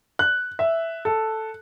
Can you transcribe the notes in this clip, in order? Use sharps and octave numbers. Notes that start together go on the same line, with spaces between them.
F#6
E5
A4